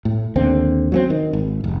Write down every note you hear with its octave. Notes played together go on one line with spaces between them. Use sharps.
A2
D#2 D3 C4
F#3 A#3 C4
D#3
G#1
F1